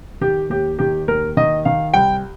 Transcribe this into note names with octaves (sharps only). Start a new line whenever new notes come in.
D#3 G4
D#2 G4
D#3 G4
D#2 A#4
D#3 D#5
D#3 F5
C2 G5